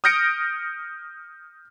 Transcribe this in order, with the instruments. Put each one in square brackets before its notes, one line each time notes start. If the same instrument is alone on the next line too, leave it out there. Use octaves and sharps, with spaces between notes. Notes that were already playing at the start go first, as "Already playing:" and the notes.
[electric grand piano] D#6 F6 G6 A#6 C#7 D7